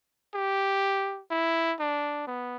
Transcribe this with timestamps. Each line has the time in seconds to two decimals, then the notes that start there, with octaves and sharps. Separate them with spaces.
0.34 G4
1.31 E4
1.80 D4
2.27 B3